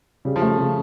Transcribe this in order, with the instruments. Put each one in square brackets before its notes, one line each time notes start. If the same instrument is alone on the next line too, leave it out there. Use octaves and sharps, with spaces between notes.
[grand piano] C#3 [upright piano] G3
[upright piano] F3
[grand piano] A3
C#3